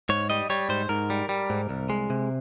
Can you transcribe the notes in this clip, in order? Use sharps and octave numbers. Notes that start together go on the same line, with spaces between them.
G#2 C#5
G3 D#5
G3 C#5
G#2 C5
G#2 A#4
G3
G3
G#2
C2
G#3
C3